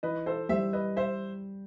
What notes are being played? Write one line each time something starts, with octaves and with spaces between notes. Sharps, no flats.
E3 B4 D#5
A4 C5
G3 C5 E5
B4 D#5
C5 E5